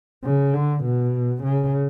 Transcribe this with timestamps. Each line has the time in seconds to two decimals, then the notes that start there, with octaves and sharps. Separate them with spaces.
0.24 C#3
0.54 D3
0.84 B2
1.43 C#3